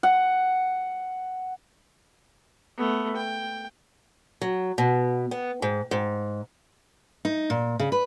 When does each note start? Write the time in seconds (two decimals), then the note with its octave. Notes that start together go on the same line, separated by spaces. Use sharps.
0.03 F#5
2.78 A3 B3
3.16 G5
4.41 F#3
4.78 B2
5.31 B3
5.62 G#2
5.91 G#2
7.25 D#4
7.50 A#2
7.79 C#3
7.92 B4